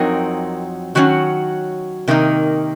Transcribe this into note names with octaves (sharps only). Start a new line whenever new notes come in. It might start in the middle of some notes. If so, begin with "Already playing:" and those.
Already playing: F2 F#3 C4 D#4 A#4
D#3 F#3 A#3 C#4 F#4
C3 D#3 A#3 D#4